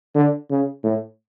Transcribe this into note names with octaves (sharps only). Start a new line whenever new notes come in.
D3
C#3
A2